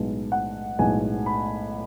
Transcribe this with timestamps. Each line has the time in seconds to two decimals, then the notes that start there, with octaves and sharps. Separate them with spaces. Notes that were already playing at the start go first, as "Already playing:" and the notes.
Already playing: B1 A2 G#3 B3
0.32 F#5
0.79 B1 A2 G#3 B3 G#5
1.26 B5